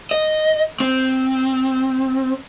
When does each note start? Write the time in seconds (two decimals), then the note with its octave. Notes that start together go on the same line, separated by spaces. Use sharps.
0.11 D#5
0.80 C4